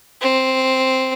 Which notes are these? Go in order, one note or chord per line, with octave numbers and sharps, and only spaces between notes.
C4